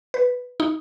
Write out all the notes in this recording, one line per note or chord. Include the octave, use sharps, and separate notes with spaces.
B4
D#4